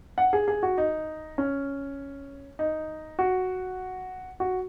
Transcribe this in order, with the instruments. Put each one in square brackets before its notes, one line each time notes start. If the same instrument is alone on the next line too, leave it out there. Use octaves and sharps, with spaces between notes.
[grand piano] F#5
G#4
G#4
F#4
D#4
C#4
D#4
F#4
F#4